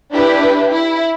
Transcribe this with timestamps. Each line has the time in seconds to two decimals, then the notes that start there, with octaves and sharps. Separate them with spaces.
0.12 D4 E4 G4 B4
0.70 E4